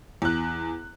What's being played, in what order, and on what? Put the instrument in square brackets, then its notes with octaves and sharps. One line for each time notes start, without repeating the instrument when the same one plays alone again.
[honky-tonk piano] E2 F#6